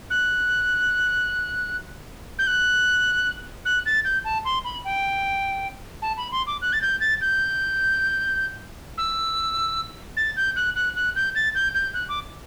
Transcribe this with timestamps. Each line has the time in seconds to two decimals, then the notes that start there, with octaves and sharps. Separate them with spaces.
0.10 F#6
2.39 G6
2.47 F#6
3.65 F#6
3.86 A6
4.05 G6
4.25 A5
4.45 C6
4.65 B5
4.85 G5
6.02 A5
6.17 B5
6.32 C6
6.47 D6
6.62 F#6
6.73 A6
6.82 G6
7.01 A6
7.21 G6
8.98 E6
10.17 A6
10.37 G6
10.56 F#6
10.76 F#6
10.96 F#6
11.16 G6
11.36 A6
11.55 G6
11.75 G6
11.94 F#6
12.09 D6